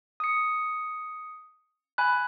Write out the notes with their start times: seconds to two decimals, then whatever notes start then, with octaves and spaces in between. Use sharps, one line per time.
0.20 D#6 C#7
1.98 G#5 B5 F#6